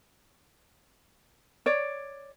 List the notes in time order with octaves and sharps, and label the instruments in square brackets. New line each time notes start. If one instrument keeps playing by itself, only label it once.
[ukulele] C#5 D5